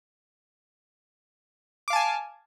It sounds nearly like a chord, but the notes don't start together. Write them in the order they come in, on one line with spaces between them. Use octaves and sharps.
D6 F5 A5 G#5